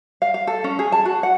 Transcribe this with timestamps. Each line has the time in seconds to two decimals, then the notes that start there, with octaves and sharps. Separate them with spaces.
0.22 F5
0.34 F5
0.47 A4
0.64 C#4
0.79 G#4
0.92 A5
1.05 F#4
1.23 F#5